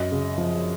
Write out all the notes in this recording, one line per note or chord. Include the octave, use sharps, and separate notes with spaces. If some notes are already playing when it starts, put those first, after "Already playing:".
Already playing: F#2 D#5
C#3
F3